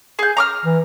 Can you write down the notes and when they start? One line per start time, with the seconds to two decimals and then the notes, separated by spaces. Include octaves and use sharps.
0.19 G#4 G6
0.37 A#5 D6 F6
0.65 E3